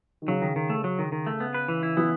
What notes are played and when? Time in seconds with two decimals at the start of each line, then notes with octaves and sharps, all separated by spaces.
0.22 D#3
0.28 C#3 F#3
0.42 D#3
0.56 D#3
0.70 A3
0.84 F#3
0.99 D#3
1.12 D#3
1.27 A3
1.40 B3
1.54 B4
1.68 E3
1.83 E4
1.97 E3 B3